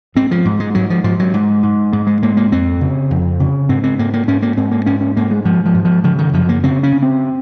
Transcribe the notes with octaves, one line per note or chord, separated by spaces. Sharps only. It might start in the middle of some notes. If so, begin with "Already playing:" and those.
G#2 C4
F3
G#2
G#3
G#2 F#3
F3
G#2 F3
F#3
G#2
G#2
G#2 G#3
G#3
G#2 A#3
A#3
F2 C4
C#3
F2
C#3
G#2 C4
C4
G#2 A#3
A#3
G#2 C#4
A#3
G#2 C4
A#3
G#2 C#4
C#4
G#2 A#3
G#3
G#2 F3
F3
G#2
F3
C#3 F3
D#3
F#2 F3
A#3
C#3 C4
C#4
C#3
C4